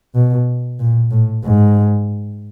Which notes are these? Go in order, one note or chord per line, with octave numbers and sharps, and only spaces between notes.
B2
A#2
A2
G#2